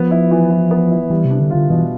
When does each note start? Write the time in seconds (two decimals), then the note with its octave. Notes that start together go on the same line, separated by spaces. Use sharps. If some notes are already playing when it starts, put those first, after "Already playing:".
Already playing: F3 B3
0.11 E4
0.31 E3
0.51 E3
0.71 B3
0.91 E4
1.10 E3 G3
1.25 C3
1.30 D4
1.40 D3
1.50 D3 F4
1.70 B2 E3